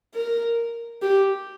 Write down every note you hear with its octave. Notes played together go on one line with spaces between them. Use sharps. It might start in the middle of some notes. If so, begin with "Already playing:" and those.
A#4
G4